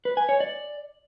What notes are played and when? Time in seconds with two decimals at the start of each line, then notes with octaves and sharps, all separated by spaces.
0.05 B4
0.17 G#5
0.29 C#5
0.40 D5